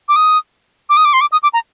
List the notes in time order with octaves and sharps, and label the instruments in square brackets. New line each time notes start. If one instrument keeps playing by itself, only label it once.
[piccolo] D6
D#6
D6
D#6
D6
C6
D6
D#6
D6
A#5